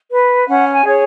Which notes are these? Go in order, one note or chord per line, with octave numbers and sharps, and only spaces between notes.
B4
C#4 F#5
G#5
G#4 C#5